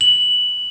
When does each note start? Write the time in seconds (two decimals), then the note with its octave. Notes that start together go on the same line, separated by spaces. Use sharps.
0.01 F#7